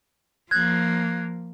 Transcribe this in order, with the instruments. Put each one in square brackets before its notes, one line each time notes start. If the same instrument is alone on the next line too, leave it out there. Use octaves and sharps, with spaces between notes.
[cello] F3 A#3 [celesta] F#6 G#6